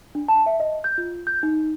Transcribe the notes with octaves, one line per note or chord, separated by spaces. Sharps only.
D4
A5
E5
D#5
G6
F4
G6
D#4